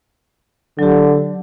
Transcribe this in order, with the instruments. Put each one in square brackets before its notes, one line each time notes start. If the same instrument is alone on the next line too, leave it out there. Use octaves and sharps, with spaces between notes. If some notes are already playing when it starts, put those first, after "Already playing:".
[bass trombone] D3 [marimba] F#3 G4